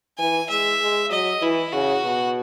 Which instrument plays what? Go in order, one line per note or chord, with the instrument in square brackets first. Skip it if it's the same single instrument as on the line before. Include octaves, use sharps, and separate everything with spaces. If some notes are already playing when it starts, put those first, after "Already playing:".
[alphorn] E3 [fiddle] G#5
[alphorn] G#3 [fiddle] E5
[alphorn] G#3
[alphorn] F#3 [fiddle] D#5
[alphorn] E3 [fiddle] E4
[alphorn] C#3 [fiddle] F#4
[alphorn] B2